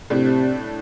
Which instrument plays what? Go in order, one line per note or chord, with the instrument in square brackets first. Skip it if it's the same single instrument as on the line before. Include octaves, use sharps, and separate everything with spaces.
[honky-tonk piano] A2 A3 D4 [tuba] C3